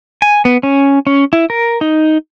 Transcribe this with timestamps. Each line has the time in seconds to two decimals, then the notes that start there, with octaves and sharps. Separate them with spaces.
0.22 G#5
0.45 B3
0.63 C#4
1.07 C#4
1.33 E4
1.50 A#4
1.81 D#4